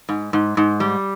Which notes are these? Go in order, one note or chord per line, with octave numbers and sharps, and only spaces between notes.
G#2
G#2
G#2
G3